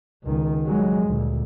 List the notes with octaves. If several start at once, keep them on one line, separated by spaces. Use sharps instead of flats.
C#2 D#3
F#3 G#3
D2 A#2